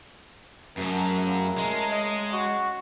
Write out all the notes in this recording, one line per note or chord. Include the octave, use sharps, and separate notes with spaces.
F#2 F#3 A3 G#4 A#4
C#3 E4
G#3 A3 C#4
D#5 A#5
F#4